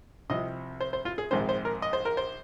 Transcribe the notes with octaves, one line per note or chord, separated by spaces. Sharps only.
C2 C3 F3 C4 D#5
C5
C5
F4
G#4
A#1 G#2 D#3 G#3 C4 C5
C5
A#4
D#5
C5
A#4
C5